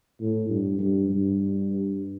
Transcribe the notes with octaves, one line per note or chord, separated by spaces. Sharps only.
A2
G2
G2
G2